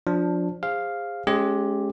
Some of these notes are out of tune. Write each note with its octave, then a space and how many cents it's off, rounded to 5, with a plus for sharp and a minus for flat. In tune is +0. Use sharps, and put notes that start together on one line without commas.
F3 +25 D4 +0
G#4 -30 C5 +5 F5 +0
G#3 +35 C#4 +0 G4 +0